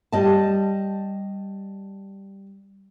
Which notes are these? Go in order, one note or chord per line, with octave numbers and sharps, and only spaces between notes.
G3 D#5 A5